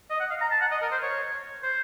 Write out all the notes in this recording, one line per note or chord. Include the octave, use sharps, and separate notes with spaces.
D#5
F#5
F5
A#5
A5
F#5
D#5
A#4
C5
C#5
C5